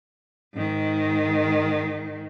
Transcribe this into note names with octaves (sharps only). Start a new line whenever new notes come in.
G#2 D#3